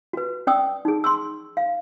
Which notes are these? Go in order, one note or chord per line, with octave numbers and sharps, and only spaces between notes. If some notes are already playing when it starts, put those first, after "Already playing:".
F#4 B4
C#4 D5 G5 D#6 E6
D#4 G#4
C6 C#6 E6
F5